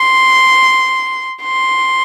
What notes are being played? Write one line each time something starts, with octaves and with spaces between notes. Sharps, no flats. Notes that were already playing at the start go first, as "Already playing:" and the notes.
Already playing: C6
C6